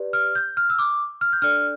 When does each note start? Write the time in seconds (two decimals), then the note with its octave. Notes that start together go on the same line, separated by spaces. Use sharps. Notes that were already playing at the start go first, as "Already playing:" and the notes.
Already playing: G4 B4 D5
0.13 F6
0.35 G6
0.57 F6
0.70 E6
0.79 D6
1.21 F6
1.33 G6
1.42 D4 A4 D5 F6